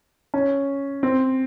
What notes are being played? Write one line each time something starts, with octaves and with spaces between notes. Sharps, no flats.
C#4
C4